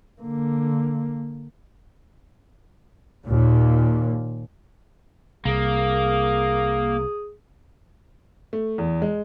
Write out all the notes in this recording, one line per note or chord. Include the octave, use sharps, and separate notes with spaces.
D3 A#3
D#2 A#2
C2 A#3 G#4
A3
E2
G#3